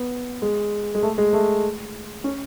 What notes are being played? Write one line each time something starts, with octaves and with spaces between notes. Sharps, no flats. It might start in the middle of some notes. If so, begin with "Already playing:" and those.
Already playing: B3
G#3
G#3
A3
G#3
A3
C#4